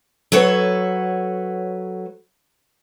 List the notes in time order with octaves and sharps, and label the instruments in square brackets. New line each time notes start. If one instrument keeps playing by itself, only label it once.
[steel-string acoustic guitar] F#3 A4 B4 C#5